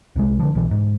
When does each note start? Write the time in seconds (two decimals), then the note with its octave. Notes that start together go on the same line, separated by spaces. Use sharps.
0.16 C2 C3 G#3
0.39 D3 F3
0.55 B1 B2 E3
0.71 G#2